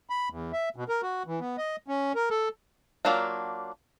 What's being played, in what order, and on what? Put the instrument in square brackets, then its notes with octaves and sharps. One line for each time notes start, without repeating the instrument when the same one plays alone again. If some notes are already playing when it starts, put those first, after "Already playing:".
[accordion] B5
E2
E5
B2
A#4
F#4
E3
B3
D#5
C#4
A#4
A4
[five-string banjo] F#3 A#3 D4 F4